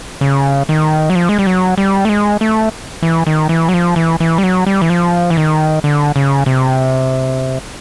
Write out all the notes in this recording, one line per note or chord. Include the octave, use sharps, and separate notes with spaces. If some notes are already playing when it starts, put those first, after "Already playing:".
C#3
D#3
F#3
F3
G#3
G3
F#3
G3
A3
G#3
A3
E3
D#3
E3
F#3
F3
E3
E3
G3
F#3
G3
E3
F3
E3
D#3
D3
C#3
C3